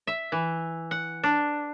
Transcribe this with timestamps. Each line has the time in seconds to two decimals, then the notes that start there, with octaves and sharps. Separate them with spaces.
0.07 E5
0.32 E3
0.91 F#5
1.24 D4